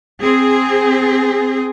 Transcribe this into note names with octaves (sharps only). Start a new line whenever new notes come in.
C4 G#4